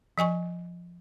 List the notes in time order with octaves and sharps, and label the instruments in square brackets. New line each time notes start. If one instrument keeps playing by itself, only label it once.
[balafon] F3 D#5 G#5 C#6